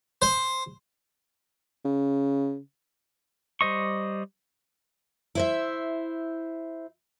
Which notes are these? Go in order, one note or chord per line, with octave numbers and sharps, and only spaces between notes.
C5
C#3
G3 C5 D#5 C#6
E4 C5 E5